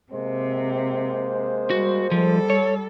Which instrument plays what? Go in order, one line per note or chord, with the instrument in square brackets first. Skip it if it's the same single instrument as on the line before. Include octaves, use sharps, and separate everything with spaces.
[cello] C3 [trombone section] G#3 A#3 C5
[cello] G3 [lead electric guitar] F#4
[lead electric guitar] F3 [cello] G3 A4
[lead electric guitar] C#5